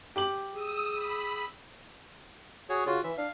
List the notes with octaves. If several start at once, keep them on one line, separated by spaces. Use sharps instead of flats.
G4 D6 F#7
G#4 D#6 E6 D#7
B5
F#4 G#4 C#5
C#3 F4 F#4
E3 E5
D4 F5